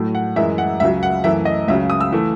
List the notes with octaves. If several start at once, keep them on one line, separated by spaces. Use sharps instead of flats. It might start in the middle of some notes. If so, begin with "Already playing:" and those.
Already playing: A2 F#3 A3
F#5
F#2 E3 G#3 E5
F#5
C#2 C#3 F#3 E5
F#5
F#2 E3 A3 E5
D#5
C#2 C#3 F#3 E5
D#6
E6
E3 A3